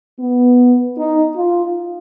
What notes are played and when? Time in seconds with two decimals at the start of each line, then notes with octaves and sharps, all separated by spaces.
0.19 B3
0.97 D#4
1.35 F4